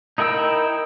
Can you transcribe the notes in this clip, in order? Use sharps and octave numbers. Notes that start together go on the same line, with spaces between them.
D#4 E4 A#4 G5 E6